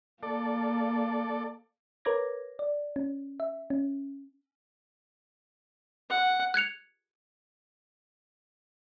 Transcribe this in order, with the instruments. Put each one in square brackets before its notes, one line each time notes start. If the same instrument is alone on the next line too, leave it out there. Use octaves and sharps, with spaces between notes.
[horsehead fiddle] A#3 [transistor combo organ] A4 D5
[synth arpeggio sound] A#4 B4 C#5 D6 G#6 A#6
D5
C#4
E5
C#4
[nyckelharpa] F#5
[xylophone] F#6 G#6 C#7 F7